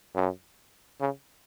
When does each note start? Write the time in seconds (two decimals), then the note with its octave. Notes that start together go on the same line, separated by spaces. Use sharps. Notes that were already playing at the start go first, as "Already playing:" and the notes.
0.15 F#2
1.01 C#3